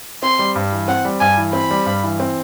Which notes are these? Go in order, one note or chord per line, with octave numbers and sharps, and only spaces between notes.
C4 C6
G3
G2
E3
C4 F#5
G3
G2 G#5
E3
C4 B5
G3
G2
E3
C4